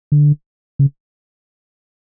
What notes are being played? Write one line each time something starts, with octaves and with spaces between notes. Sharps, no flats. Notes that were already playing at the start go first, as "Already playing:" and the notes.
D3
C#3